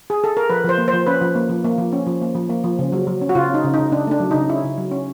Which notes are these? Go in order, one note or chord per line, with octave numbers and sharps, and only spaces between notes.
G#4
A4
A#4
F3 B4
F3 C5
A#3
C5
F3
C#4 B4
F3
A#3
F3
A#3
F3
C#4
F3
A#3
F3
A#3
F3
C#3
F#3
F#3
C#4
F#4
C#3 F4
C#4 D#4
C#3
D#4
C#3
C#3 D4
A3 D4
F#3
D#4
C#3
C#4 E4
C#3
F#3
C#4